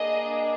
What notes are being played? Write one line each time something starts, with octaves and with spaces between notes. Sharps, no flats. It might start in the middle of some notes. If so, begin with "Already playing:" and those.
Already playing: A#3 D4 G#4 D#5